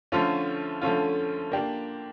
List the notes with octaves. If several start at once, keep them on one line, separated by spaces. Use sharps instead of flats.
D3 F3 A3 C#4 F4
D3 F3 A3 C#4 F4
A#3 D4 G4